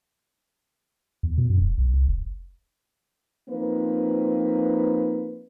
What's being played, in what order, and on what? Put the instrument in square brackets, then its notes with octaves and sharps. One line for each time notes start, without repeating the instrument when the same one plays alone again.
[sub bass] E2
B2
F#2
E1
B1
C2
F1
[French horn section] F3 A#3 C4 D#4 B4